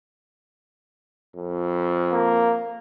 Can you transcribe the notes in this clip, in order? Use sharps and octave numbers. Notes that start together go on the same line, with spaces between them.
F2
A#3